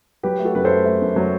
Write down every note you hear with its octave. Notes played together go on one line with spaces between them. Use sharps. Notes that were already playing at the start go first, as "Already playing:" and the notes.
F#3 G4 B4
A3
F#4 A4
F#2 B4
A4 C5
A3
A3
F#2
F#3